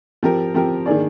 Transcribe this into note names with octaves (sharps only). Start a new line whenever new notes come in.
F3 C4 G4 A#4
F3 C4 G4 A#4
D#3 A#3 D4 G#4 D5